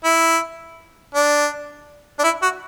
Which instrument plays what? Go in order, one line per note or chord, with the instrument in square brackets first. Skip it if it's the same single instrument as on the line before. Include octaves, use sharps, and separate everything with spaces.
[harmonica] E4
D4
D4
E4
F#4